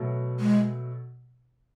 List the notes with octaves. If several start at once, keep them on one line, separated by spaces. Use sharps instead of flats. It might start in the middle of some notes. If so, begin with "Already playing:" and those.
Already playing: B2 F#3 A3
G#3